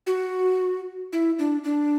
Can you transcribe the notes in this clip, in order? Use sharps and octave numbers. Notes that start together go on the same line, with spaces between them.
F#4
E4
D4
D4